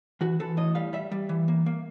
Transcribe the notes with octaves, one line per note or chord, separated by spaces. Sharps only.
E3 F#4
E3 A4
A2 D#5
G3 F5
G3 E5
G3
E3
A#3
A#3